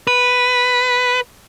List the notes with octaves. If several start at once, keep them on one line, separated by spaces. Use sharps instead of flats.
B4